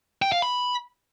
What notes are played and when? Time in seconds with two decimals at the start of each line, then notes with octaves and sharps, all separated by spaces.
0.22 G5
0.32 F5
0.42 B5